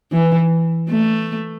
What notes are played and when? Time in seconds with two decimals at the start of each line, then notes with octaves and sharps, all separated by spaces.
0.12 E3
0.89 A3